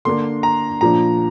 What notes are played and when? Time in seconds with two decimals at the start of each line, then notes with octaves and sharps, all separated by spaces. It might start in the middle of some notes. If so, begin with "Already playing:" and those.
0.05 D3 A#3 D4 A#4 C6
0.43 A#5
0.81 A#2 F3 D4 A#5